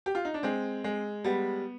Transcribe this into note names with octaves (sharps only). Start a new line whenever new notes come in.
G4
F4
D#4
D4
G#3 C4
G#3
G3 B3